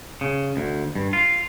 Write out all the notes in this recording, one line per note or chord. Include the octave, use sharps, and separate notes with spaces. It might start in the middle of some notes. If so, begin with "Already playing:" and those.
C#3
D2
G2
F4